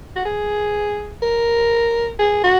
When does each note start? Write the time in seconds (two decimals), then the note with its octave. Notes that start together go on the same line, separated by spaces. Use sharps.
0.16 F#4
0.26 G#4
1.23 A#4
2.19 G#4
2.44 F#4